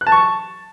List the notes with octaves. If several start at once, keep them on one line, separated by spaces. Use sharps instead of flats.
F#6
A5
C#6
A5